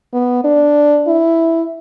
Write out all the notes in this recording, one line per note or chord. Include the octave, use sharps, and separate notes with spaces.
B3
D4
E4